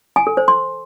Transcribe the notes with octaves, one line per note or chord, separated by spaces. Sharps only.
G#5
A4
C5
C6